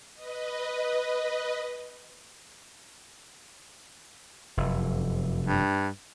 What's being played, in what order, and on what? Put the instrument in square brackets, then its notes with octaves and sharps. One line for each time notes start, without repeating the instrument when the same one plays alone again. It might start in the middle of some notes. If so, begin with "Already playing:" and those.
[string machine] B4 D#5
[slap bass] F1 F#2
[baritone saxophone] G2